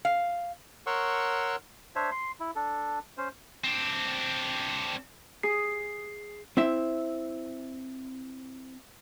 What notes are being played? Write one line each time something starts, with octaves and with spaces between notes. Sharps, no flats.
F5
A#4 C#5 F#5 C6 C#6 E6
D4 C5 C#5 E5
C6
E4
D4 A4
C#4 C5
C4 D4
G#4 C7
C4 E4 E5